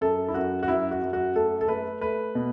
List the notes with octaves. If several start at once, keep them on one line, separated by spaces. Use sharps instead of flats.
F#2 A4
E4
F#2 F#4
F#4
F#2 E4
F#4
F#2
F#4
A3 A4
A4
A3 B4
A3 B4
B2